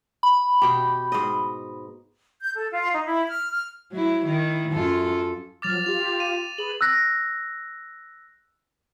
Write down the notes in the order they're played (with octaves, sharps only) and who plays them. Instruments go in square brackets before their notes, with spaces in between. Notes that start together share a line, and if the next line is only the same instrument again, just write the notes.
[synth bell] B5
[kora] B2 G4
G#2 D#5
[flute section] G6
A4
F4
D#4
E4
F6
F6
[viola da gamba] F#3 E4
D#3 E4
F#2 F4 A4
[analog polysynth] F3 F#3 F6 [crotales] D6 A6 F7
[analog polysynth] F4 G4 [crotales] F7
[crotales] D#7
[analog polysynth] G#4 B4 [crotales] F#7
[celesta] E6 F#6 A#6